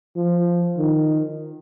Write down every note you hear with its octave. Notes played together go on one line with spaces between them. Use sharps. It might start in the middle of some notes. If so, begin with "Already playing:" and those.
F3
D#3